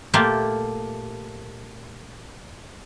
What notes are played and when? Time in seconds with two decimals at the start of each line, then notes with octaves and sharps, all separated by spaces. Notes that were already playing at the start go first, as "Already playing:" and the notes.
0.14 A#2 A3 A#3 F4 G4